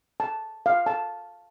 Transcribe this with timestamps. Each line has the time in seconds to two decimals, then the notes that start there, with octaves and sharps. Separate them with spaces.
0.20 A5
0.66 F5
0.86 A5